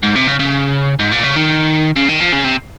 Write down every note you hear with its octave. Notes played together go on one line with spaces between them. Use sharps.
G#2
C3
C#3
C#3
G#2
A#2
C#3
D#3
C#3
D#3
F3
C#3
C3